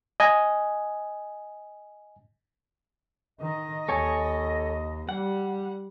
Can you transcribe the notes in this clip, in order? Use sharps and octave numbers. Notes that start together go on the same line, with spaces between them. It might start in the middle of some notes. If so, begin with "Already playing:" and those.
D#5 G#5
D#3 D#5
D#2 A4 C#5 G#5
G3 F#5